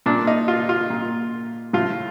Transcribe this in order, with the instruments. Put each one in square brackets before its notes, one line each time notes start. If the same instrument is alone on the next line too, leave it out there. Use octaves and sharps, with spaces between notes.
[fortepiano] A#2 D4
D#4
F4
F4
A#2
A2 F4